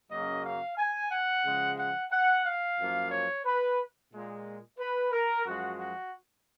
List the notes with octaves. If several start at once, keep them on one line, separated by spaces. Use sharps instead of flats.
F#2 C#3 F#3 A#3 D#5
F5
G#5
F#5
C#3 F3 G#3
F#5
F#5
F5
F#2 F3 A#3
C#5
B4
A#2 G#3
B4
A#4
F#2 F3 G#3 F#4
F#4